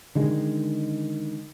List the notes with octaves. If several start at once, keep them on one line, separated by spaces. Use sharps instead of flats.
D3 D#3 G#3